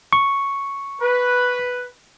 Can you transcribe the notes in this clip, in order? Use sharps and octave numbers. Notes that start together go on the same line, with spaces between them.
C#6
B4